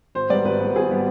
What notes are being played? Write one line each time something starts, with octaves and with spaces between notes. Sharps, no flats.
G#1 C5
G#2 G3 B3 D5
G#1 B4
G#2 G3 B3
G#1 G#4
G3 B3